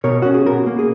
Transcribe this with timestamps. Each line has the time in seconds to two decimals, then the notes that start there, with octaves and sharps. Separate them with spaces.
0.04 B2 A#4 C#5
0.22 C#4 F#4
0.34 G#4
0.46 B2 F#4 A#4
0.67 A#3
0.79 G#4